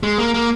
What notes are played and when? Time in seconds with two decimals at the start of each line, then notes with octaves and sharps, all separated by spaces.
0.03 G#3
0.18 A#3
0.34 A#3